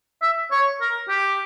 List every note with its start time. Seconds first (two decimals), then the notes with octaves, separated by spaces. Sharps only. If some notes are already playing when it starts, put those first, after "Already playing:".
0.22 E5
0.51 C#5
0.81 A#4
1.09 G4